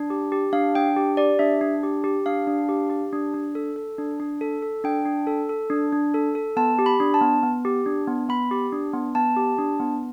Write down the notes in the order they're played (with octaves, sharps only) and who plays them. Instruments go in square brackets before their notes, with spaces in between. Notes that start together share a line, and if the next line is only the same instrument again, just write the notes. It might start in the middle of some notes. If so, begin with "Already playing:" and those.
Already playing: [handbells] D4
G4
G4
D4 F5
D4 G5
G4
G4 D5
D4 E5
D4
G4
G4
D4 F5
D4
G4
G4
D4
D4
A4
A4
D4
D4
A4
A4
D4 G5
D4
A4
A4
D4
D4
A4
A4
B3 A5
G4
B5
D4
A5
B3
B3
G4
D4
B3
B3 B5
G4
D4
B3
B3 A5
G4
D4
B3